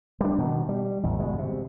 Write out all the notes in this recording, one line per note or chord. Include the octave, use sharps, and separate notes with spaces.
G3 D4
B2 D#3
G3
A1 E2
G1 B2 G#3
C3